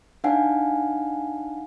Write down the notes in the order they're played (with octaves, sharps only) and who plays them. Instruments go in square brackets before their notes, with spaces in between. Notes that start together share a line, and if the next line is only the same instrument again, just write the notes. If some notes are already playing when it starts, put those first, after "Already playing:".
[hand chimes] D4 D#4 F5 F#5 G#5